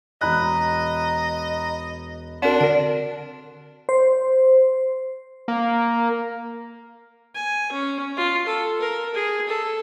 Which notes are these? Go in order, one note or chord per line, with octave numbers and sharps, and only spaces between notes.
E1 D#5 A#5 B5 F#6
C4 D4 F#4 A#4 F#5
D3 A#4 D5
C5
A#3
G#5
C#4
F4
A4
A#4
G#4
A4